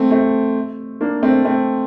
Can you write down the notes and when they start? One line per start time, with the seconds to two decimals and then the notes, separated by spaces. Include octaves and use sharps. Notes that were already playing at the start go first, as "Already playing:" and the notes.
Already playing: A3 C4
0.11 A3 C4
1.01 A#3 D4
1.23 A3 C4
1.45 A3 C4